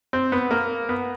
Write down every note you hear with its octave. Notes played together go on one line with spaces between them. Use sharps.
C4
B3
A#3
B3